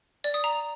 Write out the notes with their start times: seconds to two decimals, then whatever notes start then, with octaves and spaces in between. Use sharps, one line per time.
0.24 D5
0.34 D#6
0.44 A#5